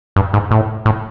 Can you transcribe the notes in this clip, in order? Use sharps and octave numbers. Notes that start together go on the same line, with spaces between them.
G2
G#2
A2
A2